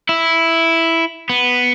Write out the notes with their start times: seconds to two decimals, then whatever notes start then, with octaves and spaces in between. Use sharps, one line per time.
0.09 E4
1.30 B3